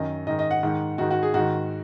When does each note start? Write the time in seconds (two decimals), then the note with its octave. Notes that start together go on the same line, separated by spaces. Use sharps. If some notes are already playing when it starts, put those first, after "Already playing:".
Already playing: F#2 D#3 D#5
0.27 G#2 D#3 D#5
0.39 D#5
0.51 F#5
0.63 G#2 D#3
0.98 G#2 D#3 F#4
1.11 F#4
1.23 G#4
1.34 G#2 D#3 F#4